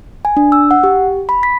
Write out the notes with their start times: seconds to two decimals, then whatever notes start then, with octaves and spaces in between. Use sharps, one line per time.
0.25 G#5
0.37 D4
0.52 E6
0.71 F#5
0.84 G4
1.29 B5
1.43 B6